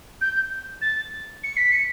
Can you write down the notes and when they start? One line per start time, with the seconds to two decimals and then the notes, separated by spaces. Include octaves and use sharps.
0.21 G6
0.82 A6
1.44 C#7
1.57 B6
1.72 C#7